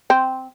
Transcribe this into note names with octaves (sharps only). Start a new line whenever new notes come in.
C4